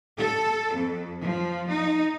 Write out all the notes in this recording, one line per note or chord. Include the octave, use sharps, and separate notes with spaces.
A4
F2
F3
D#4